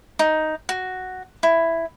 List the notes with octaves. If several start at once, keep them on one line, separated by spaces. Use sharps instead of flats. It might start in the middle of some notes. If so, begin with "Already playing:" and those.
D#4
F#4
E4